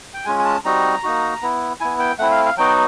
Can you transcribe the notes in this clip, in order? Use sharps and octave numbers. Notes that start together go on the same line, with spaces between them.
G5
G#3 C#4 F4 G#5
G#5
A5
G3 C4 D#4 F#4 A#5
A#3 D#4 F#4
B3 E4
B3 E4 G#5
G5
A3 C4 E4 F#5
F5
F5
F#3 B3 D#4 F#4 G5